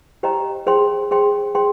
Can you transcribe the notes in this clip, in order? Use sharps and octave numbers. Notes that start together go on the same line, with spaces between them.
G4 C5 D#5 G5 A#5
G#4 C5 G5 C6
G#4 C5 G5 C6
G#4 C5 G5 C6